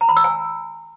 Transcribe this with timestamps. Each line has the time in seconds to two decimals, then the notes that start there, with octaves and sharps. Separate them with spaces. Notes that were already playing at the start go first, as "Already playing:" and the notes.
0.01 A#5
0.09 B5
0.16 E6
0.24 G#5